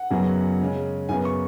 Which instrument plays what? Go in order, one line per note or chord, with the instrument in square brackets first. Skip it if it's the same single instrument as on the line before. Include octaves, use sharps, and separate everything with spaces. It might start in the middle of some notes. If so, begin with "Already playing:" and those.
Already playing: [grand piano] F#5
F#2 C#3 F#3 B3
C#3 G#3 C#4
F#2 C#3 B3 G#5
C#6